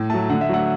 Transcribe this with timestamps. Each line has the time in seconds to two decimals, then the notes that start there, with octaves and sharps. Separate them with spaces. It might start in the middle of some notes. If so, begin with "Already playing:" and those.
Already playing: A2
0.10 F#3 A3 A5
0.30 D3 F#5
0.41 E5
0.49 F#3 A3 F#5